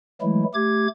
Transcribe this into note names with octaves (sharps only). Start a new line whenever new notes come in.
E3 F#3 G#3 A3 E4
A3 G4 D6 G#6